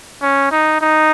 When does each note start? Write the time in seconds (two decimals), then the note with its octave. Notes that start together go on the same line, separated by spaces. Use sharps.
0.22 C#4
0.51 D#4
0.81 D#4